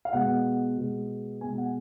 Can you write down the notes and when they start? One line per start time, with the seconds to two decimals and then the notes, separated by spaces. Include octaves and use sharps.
0.05 F5
0.13 B2 G#3 B3 F#5
0.78 B2 G#3 B3
1.41 B2 G#3 B3 G#5
1.58 F#5